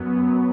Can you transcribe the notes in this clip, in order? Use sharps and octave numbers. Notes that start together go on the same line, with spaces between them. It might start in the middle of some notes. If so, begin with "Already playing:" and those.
Already playing: F#2 F#3 B3